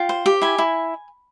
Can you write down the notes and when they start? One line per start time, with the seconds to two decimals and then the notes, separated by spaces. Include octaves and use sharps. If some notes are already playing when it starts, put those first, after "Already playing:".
Already playing: F4 G5
0.09 C5
0.26 G4
0.42 E4 G#5
0.58 E4